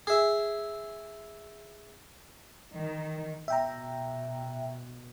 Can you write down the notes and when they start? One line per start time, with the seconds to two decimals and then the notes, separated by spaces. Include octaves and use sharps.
0.07 G#4 E5
2.75 D#3
3.48 B2 E5 G5 A#5